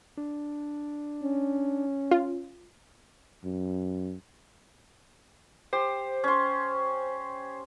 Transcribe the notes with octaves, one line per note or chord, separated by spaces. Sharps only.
D4
C#4
F4
F#2
G4 C5
C#4 C6